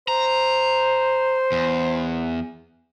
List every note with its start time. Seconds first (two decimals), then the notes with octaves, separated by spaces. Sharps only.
0.08 C5 A#5
1.52 E2